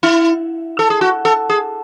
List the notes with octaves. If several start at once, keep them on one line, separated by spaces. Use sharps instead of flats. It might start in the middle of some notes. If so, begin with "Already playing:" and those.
E4
A4
G#4
F#4
A4
G#4